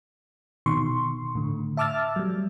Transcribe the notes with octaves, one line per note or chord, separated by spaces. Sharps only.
B2 D#3 C6 C#6
A2 D3
E5 A5 D6 E6 F6 A6
F#3 G3